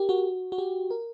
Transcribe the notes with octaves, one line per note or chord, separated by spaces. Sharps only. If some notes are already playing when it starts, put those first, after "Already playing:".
Already playing: G4 A#4
F#4
F#4
G4
A#4